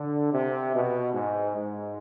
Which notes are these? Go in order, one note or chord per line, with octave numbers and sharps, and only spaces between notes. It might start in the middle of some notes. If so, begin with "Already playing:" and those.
Already playing: D3
C3
B2
G#2
G#2